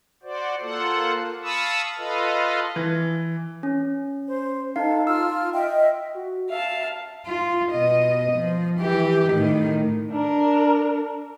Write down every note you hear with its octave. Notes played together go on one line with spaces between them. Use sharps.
F#4 C5 D5
A#3 F4 A4 C5 F#5
F5 A5 B5 C#6 D#6 E6
F4 A4 B4 D#5 F5
E3
C#4
C5
D#4 A4 F5
F4 E6 F6
D#5 E5 G5
F#4
E5 F5 A5
F4
B2 D#5
F3
E3 G4
A2 D#3
D4 A#4